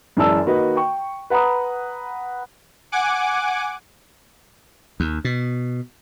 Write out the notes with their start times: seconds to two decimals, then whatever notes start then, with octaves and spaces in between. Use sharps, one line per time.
0.17 F#2 E3 G#3 D5 A5 E6
0.45 D#3 A#3 F#4 B4 D#5
0.76 G5 C#6
1.30 B4 F#5 A#5 B5 D#6
2.92 F#5 G#5 D6
5.00 D#2
5.25 B2